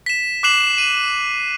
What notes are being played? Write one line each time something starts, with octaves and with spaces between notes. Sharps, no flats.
B6 E7
D6 F#6 C7 E7 F#7
D#7 F#7